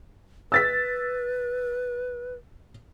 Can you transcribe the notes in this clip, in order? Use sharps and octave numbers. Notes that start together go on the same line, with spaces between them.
B4 E6 A6 B6